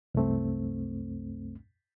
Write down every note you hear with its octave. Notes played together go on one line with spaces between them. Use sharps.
C2 F#2 A3 C4